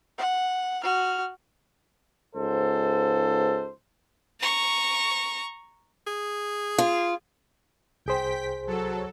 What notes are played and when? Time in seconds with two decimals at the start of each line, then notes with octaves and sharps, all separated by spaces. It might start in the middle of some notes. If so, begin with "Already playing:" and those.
0.18 F#5
0.83 F#4 F6
2.35 C#2 G#2 A4 C5
4.40 A#5 C#6
6.07 G#4
6.78 F4
8.06 C2 G#4 C5 G5 B6
8.67 F#3 A4